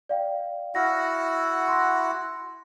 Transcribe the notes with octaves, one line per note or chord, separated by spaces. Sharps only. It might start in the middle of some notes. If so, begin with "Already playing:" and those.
D5 F5 G5
E4 F#4 F#5 F6 A#6
C6 A#6